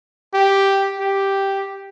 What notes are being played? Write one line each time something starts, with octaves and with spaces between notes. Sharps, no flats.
G4
G4